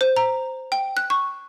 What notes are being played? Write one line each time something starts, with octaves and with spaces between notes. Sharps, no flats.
C5
A#5
G5
F#6
C#6